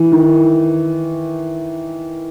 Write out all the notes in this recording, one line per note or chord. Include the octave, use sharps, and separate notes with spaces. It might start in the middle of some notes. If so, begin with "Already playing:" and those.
Already playing: E3
D#3